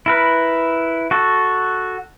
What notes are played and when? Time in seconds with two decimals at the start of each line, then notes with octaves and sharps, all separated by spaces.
0.06 E4 A#4 B4
1.11 F#4 A4